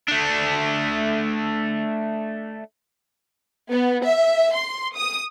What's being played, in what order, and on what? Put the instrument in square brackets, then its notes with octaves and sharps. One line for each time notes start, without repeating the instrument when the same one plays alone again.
[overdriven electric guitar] A3 D4
[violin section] B3
E5
C6
D#6